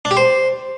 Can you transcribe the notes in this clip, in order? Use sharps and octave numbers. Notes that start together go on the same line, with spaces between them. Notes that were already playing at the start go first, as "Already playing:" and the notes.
D4
G4
C5